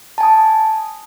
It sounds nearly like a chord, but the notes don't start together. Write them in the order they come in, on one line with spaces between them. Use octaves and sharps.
A5 G#5 D#6